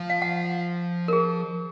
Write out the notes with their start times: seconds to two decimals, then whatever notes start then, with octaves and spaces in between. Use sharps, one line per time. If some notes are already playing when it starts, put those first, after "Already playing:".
Already playing: F3
0.10 F5
0.22 F#5
1.08 A#4
1.13 G#4